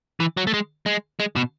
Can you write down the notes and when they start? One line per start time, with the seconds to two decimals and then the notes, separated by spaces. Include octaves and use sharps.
0.20 E3
0.37 F#3
0.47 A3
0.54 G#3
0.86 G#3
1.20 G#3
1.36 B2